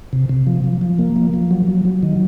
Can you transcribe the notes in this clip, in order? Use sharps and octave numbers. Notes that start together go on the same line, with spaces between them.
C3
C3
F3
F3
F3
A#3
F3
F3
F#3
F#3
F#3
D#3